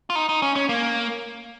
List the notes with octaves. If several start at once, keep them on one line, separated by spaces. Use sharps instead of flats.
F4
D#4
D#4
C#4
C#4
A#3